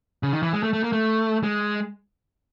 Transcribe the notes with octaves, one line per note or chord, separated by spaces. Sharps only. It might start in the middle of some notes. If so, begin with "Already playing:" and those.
C#3
D#3
E3
G#3
A3
A3
A#3
A3
G#3